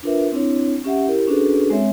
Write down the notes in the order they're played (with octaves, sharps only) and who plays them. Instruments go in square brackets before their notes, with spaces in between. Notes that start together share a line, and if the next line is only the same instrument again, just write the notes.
[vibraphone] D4 F4 A#4 B4 E5
C4 D4 E4 C#5
C#4 G4 E5 F#5
E4 G4 A#4
C#4 D4 F#4 G#4 A4 B4
G#3 C4 C#5 E5